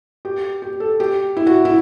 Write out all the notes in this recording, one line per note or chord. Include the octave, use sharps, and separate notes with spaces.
G4
G4
A4
G4
E4
F#4
E4